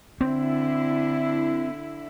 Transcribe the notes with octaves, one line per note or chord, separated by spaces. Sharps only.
D3 C4 E4